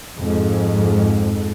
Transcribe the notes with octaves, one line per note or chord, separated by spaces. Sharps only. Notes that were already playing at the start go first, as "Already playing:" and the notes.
F2 G#2